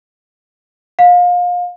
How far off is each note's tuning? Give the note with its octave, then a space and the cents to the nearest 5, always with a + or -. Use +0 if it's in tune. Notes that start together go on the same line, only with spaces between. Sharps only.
F5 +30